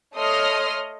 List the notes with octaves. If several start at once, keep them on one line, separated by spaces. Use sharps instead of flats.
A3 C#5 D#5 C6 D#6 F6